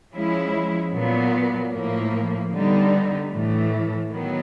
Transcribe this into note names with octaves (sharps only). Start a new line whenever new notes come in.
F3 G#3 C#4 E4
A#2 F#3 B3
A2 F3 A#3
D3 G3 B3 D#4
A2 E3 A3
D#3 F#3 B3